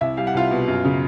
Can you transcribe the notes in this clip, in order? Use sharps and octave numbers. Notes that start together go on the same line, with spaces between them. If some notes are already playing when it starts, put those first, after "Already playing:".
C2 E4 E5
G3 F5
F#5
C2 F4 F5
B2
F#2
C#3